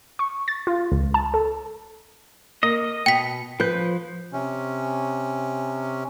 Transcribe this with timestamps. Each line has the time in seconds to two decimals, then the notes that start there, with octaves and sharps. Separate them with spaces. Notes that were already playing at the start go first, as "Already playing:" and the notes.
0.19 C#6
0.48 A6
0.67 F4
0.92 C#2
1.14 A5
1.34 A4
2.63 A#3 D#5
3.06 B2 G5 B6
3.60 F3 B4 G6
4.33 C3 C#4